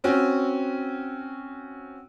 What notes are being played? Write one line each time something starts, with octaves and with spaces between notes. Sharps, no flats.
C4 C#4 F#4